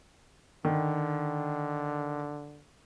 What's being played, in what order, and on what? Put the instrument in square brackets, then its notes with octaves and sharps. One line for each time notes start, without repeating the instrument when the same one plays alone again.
[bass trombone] D3 [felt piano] D#3